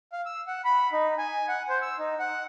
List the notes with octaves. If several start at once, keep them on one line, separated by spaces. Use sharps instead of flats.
F5
E6
F#5
B5
D#4
G#5
F#5
C5
E6
D#4
F#5